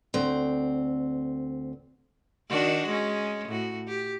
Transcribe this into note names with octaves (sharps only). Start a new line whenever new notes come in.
D2 C4
D#3 D4 F#4
G#3 C#4
A2 F#4
G4